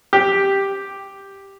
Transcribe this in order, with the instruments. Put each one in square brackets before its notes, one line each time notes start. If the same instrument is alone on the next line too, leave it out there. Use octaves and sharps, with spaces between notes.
[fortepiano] G4